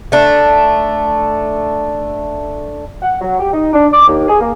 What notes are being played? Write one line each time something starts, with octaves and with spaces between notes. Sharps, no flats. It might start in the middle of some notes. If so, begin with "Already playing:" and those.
A3 D4
F#5
F#3
G4
D#4
D4
D6
D#2
G#4
A#3